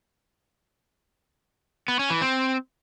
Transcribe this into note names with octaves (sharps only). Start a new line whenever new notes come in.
B3
C#4
E3
C4